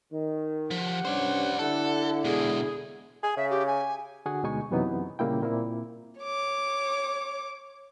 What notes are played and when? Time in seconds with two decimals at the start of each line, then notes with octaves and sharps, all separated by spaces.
0.11 D#3
0.71 F3 G4 F#5
1.05 G2 C#4 C5 D5
1.59 D3 E4 A4
2.25 B2 G#3 G#4
3.23 G#4 G#5
3.37 C#3 E5
3.50 G4
3.67 G#5
4.26 D3 F#4 G#4 F#5 G#5
4.43 D2 B2 G#3 D#4 G#5 C#6
4.71 F#2 C3 E3 F#3 B3 D#4
5.19 A#2 C#3 G3 A#3 E4 G5
5.42 A#2 A#3 C4 E4
6.19 C#5 D6